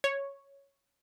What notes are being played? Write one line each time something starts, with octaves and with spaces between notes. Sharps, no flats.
C#5